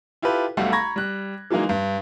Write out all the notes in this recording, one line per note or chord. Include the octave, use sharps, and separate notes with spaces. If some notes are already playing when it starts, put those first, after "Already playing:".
E4 F4 G4 A4 B4
B1 B2 G3 A3 F5 F#5
A#5 B5 C#6 G#6 A#6
G3 F#6
E3 F#3 G#3 A#3 D#4
G2